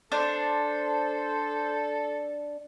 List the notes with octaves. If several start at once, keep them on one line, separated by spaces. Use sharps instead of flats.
D4 A4 C5